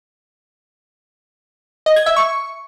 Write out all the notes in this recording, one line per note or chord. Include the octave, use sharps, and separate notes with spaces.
D#5
G#6
E5
C#6